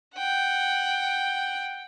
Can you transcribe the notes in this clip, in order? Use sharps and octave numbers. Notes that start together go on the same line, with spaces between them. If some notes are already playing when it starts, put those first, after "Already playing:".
F#5 G5